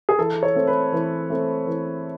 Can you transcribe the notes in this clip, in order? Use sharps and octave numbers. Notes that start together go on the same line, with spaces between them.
G#4
E3 A4
C#5
A3 C4
B4
E3
A3 C4
E3